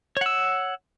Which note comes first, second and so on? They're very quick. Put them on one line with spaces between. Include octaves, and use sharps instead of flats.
C#5 F#5 E6